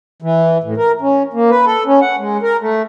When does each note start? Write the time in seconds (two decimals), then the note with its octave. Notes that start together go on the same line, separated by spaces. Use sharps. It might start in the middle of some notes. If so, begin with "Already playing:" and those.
0.22 E3
0.63 A2
0.77 A#4
1.01 C#4
1.33 A#3
1.50 B4
1.65 A4
1.86 C#4
2.02 F#5
2.19 G#3
2.42 A#4
2.60 A3